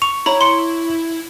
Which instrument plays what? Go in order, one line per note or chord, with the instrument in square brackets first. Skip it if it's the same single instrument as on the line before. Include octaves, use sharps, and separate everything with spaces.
[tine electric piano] C#6 [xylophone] F7
[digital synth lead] E4 [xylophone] C#5 A#5 B5
[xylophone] C6 C#7